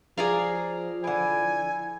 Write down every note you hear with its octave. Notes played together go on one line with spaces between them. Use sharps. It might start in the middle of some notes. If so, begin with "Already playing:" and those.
F3 G#4 D5 F5 A#5
D3 E4 G#5